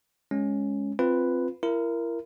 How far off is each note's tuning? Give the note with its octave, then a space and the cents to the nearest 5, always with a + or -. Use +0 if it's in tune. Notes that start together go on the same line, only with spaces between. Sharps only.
G#3 +0 C#4 +0
C4 +0 F4 +0 B4 +5
E4 +35 A#4 +0